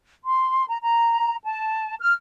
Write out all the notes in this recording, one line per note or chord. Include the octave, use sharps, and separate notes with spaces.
C6
A#5
A#5
A5
F6